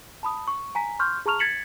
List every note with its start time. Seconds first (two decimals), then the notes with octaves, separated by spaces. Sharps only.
0.23 A5 B5 D#6
0.47 C#6
0.75 G#5 A#5 B6
0.99 C6 C#6 F6 G6
1.26 G#4 A5 A#5 C#6 F6 F7
1.39 G#6 A6 B6 C#7 E7 F#7